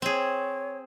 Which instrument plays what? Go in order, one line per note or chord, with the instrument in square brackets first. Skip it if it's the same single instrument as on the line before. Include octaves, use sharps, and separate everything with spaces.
[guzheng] C4 G#4 [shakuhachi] C#5